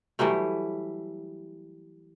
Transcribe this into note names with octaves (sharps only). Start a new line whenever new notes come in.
E3 F#3 G3 A3